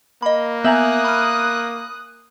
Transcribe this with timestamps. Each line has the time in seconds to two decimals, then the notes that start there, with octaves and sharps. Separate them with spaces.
0.22 A#3 D#5 B5
0.64 B3 E5 G#5 A#5 D#6 F#6 G6 F#7
1.05 B5 F6